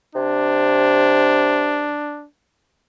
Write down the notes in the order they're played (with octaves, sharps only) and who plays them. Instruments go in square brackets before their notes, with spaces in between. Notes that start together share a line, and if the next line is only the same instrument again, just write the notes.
[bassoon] C3 [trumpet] D4